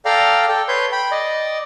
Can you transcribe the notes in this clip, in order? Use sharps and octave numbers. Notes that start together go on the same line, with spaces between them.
A4 D5 F5 G5 A#5 F6
A4 G5
B4 C#5 C6 G6
G5 B5
D5 D#5